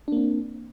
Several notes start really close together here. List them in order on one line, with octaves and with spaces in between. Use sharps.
D4 A#3 C4